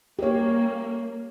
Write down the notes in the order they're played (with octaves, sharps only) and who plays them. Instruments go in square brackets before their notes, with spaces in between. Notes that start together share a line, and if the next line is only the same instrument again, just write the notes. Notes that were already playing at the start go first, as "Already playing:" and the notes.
[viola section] A#3 [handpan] G4 C#5